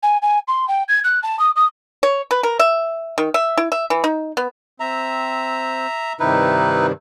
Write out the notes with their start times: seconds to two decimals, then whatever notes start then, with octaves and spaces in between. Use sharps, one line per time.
0.03 G#5
0.22 G#5
0.48 C6
0.68 G5
0.88 G#6
1.04 F#6
1.23 A5
1.39 D#6
1.56 D#6
2.03 C#5
2.31 B4
2.43 A#4
2.59 E5
3.18 D#3
3.34 E5
3.57 E4
3.72 E5
3.90 E3
4.04 D#4
4.37 B3
4.80 C4 E5 A#5
6.20 G2 C3 D#3 D#4 E4 B4